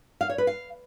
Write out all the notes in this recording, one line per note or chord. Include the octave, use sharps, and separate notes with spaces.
F5
C#5
B4
F5